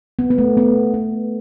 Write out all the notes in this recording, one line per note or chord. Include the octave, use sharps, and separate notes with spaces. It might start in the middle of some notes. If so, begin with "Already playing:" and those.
B3
B3
A3
B3
B3